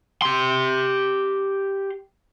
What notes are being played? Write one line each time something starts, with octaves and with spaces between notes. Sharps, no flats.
G4 C6